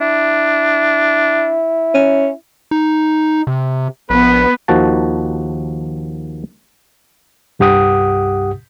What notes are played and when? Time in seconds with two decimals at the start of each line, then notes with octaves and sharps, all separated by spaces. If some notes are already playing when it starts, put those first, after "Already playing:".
0.01 D4 E4
1.94 C#4
2.71 D#4
3.47 C3
4.10 A#1 B3 B4
4.68 D#2 D#3 F3 F#4 A5
7.59 C2 G2 G4 F#5 D#6